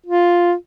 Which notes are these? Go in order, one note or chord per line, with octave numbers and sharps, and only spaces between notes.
F4